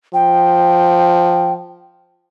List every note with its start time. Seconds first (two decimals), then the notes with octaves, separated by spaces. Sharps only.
0.14 F3 G5